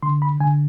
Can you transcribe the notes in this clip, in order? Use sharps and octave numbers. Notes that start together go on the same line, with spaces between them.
D3 C6
B5
D3 G#5